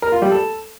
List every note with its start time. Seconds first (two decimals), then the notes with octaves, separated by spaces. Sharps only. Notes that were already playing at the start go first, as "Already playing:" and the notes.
0.02 A#4
0.12 F4
0.22 G3
0.32 A4